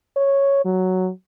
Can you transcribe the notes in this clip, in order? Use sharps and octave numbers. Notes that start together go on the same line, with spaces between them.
C#5
F#3